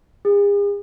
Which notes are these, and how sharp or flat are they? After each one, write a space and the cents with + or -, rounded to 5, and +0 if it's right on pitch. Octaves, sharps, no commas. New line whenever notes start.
G#4 -45